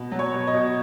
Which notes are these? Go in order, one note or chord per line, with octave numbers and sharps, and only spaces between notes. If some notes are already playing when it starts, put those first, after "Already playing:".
Already playing: B2
F#3
C#5
B2
D#5
B2